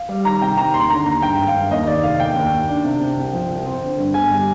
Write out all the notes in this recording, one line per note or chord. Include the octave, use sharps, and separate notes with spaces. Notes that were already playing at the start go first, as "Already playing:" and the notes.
Already playing: F5
G3
D#3 A#5
C3 G5
D#3 A#5
D#2 C6
D3 A#5
D#2 A#5
G2 G5
G#1
F5
G2
D#2 D#5
D#3 D5
F1 F5
D#2 G5
D#2
D#3
D4
C3
C3
C2
F3
C2
C4
D3
G2
G1 G#5
G3